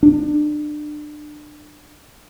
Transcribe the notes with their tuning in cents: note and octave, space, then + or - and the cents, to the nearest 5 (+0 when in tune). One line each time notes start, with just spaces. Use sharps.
D4 +30